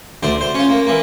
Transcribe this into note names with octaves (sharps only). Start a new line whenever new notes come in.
D2 D4 C5
C5
C#4 F4
A#3
E3 A#3